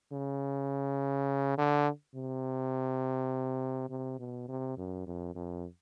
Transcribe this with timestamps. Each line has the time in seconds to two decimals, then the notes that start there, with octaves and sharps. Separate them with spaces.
0.13 C#3
1.58 D3
2.15 C3
3.90 C3
4.19 B2
4.48 C3
4.78 F#2
5.07 F2
5.35 F2